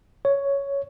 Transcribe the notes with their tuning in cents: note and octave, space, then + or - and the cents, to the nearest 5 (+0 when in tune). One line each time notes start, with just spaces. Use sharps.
C#5 +5